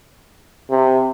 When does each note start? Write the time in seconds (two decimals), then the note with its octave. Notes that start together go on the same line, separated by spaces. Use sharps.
0.71 C3